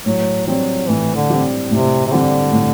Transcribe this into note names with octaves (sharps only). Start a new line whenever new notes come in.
A2 F#3
F#3 G3 C4
A2 E3
D3
G3 C4
A2 C3
C3
D3 G3 C4
A2